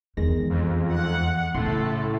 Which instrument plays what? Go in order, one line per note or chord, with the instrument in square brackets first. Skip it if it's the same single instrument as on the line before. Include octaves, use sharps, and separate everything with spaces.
[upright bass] E2 [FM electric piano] D#3 G#3 A#6
[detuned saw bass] F2
[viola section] F#5
[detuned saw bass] A2 [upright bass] C#3 [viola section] A3 A4 [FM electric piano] C6